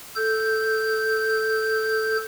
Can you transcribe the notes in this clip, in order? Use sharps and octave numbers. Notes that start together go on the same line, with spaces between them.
A4 G6